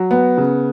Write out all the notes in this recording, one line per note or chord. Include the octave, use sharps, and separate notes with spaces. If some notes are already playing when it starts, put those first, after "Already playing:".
Already playing: F#3
B3
C#3